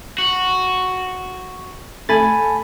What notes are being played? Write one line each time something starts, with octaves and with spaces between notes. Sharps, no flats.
F#4
A3 G#5 B5 A6